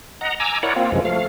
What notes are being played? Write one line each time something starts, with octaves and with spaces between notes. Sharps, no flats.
D#5 F#5 A#5
G#5 A#5 D6 E6
E4 A#4 C#5 D5 F#5
A#3 C4 F4
F#2 C3 E3 F3 G#3
F3 A3 F5